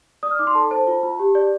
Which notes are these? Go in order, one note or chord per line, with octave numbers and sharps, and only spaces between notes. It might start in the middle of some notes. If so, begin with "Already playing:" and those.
D5 D#6
F6
D#4 D6
C6
A4 A5
C5 A5
F4
F4
G4
D5